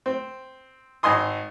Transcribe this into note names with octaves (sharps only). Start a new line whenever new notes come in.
C4
G#1 D#5 G#5 B5 C6 D#6